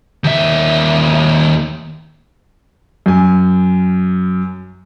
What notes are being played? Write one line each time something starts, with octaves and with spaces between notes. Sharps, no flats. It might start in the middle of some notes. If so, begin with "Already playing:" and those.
D#2 E5
F#2 G#5